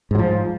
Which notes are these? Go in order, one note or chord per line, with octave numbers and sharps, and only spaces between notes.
G#2 F3 F#3